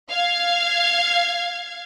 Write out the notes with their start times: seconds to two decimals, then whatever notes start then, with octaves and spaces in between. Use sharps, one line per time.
0.10 F5 G#6